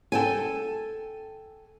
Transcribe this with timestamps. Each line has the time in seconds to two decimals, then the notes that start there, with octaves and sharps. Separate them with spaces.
0.12 A4 G5 G#5